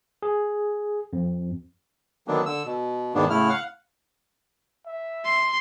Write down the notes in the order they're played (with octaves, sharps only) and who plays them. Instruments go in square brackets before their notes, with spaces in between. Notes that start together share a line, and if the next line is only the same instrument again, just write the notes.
[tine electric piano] G#4
F2
[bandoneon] D3 D#3 F#3 A#3 B3 D4
D3 E6
B2
E2 G#2 D#3 A#3 B3 D4
A2 C#3 A3 E4 F6
F5 F#5
[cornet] E5
[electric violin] C6